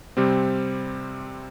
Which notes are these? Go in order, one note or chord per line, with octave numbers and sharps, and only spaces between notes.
C3 G3 C4